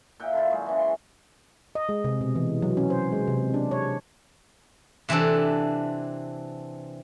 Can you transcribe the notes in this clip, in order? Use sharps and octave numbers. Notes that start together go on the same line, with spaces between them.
A#2 E5 F#5 G5
D3 E4 F4
F#3 G#3
C#3 E3
C6
D#5
G#3
C3
B2
E3
F#3
C#4
C5
G#3
C3
D4
C#5
C3 E3 C4 D4 A4